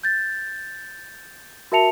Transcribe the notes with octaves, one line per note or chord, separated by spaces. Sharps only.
G6 A6
F#4 A#4 E5 A5 C#7 F7